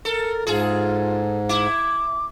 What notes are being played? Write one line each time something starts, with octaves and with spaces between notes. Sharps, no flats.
A4 A#4
G#2 F4 G#4 A4
E4 D6